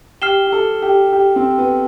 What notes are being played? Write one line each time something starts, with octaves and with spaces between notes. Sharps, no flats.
G4 F6 C7 E7 G7
G4
A4
G4
G4
C4
B3